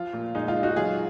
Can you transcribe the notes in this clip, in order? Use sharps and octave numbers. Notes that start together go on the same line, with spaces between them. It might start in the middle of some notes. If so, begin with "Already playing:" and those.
Already playing: F3 F4
A#2
G#3 D#4
F4
G#3
D#4 F#4
F#3 F4 G#4